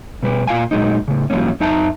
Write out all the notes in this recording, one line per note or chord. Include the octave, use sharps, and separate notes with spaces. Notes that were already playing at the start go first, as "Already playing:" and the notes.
B2 G3 B4
A#2 F4 F5 G#5
A#2 F#3 G#3 D#4
A2 C#3
G#2 E3 F#3 G3 A#3 C#4
F#2 D#4 E5 A5 A#5